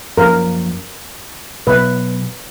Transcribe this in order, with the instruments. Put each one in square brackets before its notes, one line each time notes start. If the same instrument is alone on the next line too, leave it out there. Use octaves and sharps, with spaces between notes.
[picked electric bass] F#2 F3 A#3 C#4 [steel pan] A#4
[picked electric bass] B2 F#3 B3 [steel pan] B4